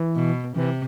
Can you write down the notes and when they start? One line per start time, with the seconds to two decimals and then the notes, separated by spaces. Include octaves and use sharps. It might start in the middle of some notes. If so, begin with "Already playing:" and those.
Already playing: E3
0.16 B2
0.56 C3 E3